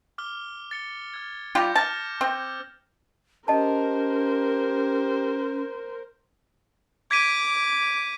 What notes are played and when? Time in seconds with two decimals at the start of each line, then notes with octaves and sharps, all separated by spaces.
0.18 D6 F6 G7
0.71 A6 C#7 G7
1.14 F6 G#6
1.55 G3 F4 G4 D6 G6 A#6
1.76 A5 F6 A#6 E7
2.21 C4 E6
3.48 C#4 G4 A#4 C5 D#5 A5
7.11 D6 G#6 B6 D#7